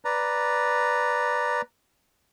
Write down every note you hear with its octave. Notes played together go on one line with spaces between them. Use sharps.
B4 D5 A#5